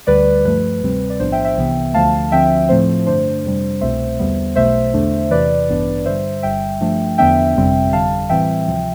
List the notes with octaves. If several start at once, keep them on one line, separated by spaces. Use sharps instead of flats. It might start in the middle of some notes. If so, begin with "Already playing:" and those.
D2 D3 G3 B4 D5
G2 F3 A3 B4
D2 C3 G3 C4
D5
B1 A2 F3 B3 D4 C5
E5 G5
E5 G5
C2 C3 E3 B3
D2 D3 F3 A3 F5 A5
D2 D3 F3 C4 E5 G5
A2 F3 A3 C4 C5
G2 D3 A3 D4 C5
F2 C3 G3 D4
C2 B2 A3 C4 C5 E5
E2 D3 G3 B3
B1 B2 A3 C5 E5
E2 D3 A3 D4
E2 C3 E3 B4 D5
A1 G2 E3 B3 D4
G2 D3 G3 C5 E5
G1 G2 D3 G3 E5 G5
G2 F3 A3 D4
E2 D3 F3 B3 D4 E5 G5
G1 F2 C3 G3 C4
G1 F2 D3 G3 F5 A5
A2 E3 G3 C4 E5 G5
D2 C3 F3